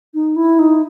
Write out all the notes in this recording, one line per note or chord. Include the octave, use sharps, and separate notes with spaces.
D#4
E4
D#4